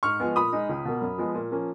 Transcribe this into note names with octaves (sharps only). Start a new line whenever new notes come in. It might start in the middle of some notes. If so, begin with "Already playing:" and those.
G#2 C#6 F6
F3 G#3 B3
A#2 B5 D#6
G#3 D#4
C#2
B2 A#3
F#2
F3 G#3 B3
A#2
F3 A#3 C#4